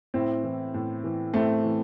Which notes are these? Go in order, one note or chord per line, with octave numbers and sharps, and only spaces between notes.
A2 C4 E4
E3
A2
E3
A2 A3 C4
E3